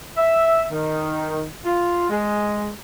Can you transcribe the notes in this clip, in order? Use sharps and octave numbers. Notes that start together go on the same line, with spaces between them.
E5
D#3
F4
G#3